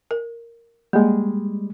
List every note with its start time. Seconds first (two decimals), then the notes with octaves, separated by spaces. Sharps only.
0.11 A#4
0.93 G3 G#3 A#3